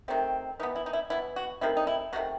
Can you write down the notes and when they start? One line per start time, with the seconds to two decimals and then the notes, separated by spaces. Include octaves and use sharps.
0.08 C3 D#3 A3 C4
0.60 E3 D#4
0.63 B3
0.76 E4
0.86 D#4
0.93 E4
1.10 E3 B3 E4
1.36 F#4
1.61 C3 D#3 A3 C4 E4
1.77 D#4
1.87 E4
2.13 C3 D#3 A3 C4 F#4